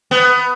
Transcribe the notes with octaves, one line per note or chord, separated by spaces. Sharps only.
B3